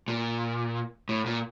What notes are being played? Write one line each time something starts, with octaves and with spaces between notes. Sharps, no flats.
A#2
A2
A#2